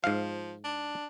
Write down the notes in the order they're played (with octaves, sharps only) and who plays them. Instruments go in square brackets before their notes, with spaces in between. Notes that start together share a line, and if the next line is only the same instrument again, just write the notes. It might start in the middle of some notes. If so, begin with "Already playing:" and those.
[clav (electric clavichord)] G#2 F5 [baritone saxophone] F3
[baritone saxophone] D4